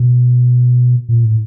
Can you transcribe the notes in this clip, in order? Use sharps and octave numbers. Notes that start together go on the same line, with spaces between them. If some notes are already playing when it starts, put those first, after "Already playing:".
Already playing: B2
A#2
A2